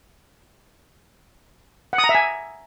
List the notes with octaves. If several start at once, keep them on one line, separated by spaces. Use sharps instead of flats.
F#5
D#6
A#5
E5
G#5